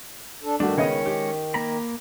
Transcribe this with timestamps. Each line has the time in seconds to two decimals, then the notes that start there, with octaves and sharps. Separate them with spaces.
0.43 D4 A4
0.60 G2 D#3 A3 D4 F#4
0.77 C#3 G#3 B3 C#4 C#5 D#5
1.06 G4
1.54 A#3 A#5 B5